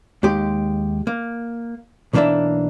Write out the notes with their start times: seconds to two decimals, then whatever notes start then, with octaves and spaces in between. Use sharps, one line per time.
0.23 D#2 G#3 G4
1.07 A#3
2.13 B1 E3 A#3 D4 A#4 E5